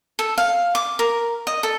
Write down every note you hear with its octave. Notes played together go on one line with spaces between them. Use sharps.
A4
F5
D6
A#4
D#5
A4